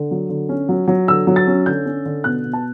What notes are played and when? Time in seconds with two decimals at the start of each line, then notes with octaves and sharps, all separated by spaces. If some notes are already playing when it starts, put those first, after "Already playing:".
Already playing: D3
0.11 F#3
0.29 D3
0.49 C#4
0.69 F#3
0.88 F#3
1.08 D3 E6
1.27 F#3
1.36 A6
1.47 C#4
1.66 D3 G6
1.85 C#4
2.05 D3
2.24 B2 F#6
2.44 B2
2.53 A5